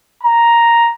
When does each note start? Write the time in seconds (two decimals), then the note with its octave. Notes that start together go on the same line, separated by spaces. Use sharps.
0.22 A#5